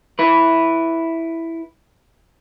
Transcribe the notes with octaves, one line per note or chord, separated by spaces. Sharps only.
E4 B4